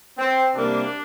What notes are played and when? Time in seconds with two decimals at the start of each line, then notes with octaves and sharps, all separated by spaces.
0.18 C4
0.55 C3 G3 A#3 D4